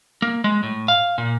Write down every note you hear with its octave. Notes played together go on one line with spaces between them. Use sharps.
A#3
G#3
A2
F5
A#2